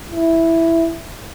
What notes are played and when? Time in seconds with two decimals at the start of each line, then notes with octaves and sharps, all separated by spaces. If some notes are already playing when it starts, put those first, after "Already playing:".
0.11 E4